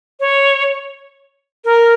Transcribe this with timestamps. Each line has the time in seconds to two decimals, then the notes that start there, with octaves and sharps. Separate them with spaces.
0.20 C#5
1.65 A#4